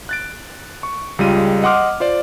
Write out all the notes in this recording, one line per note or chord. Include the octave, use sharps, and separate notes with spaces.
F#6 A6 D7
C#6
C#2 G3 G#3 F4 D#7
D#5 F#5 C6 D6 F6
F4 C5 D5